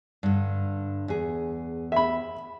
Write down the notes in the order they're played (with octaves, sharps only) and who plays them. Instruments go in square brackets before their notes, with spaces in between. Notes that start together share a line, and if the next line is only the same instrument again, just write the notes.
[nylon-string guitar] G2 D3
E2 G#4
[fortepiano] E5 B5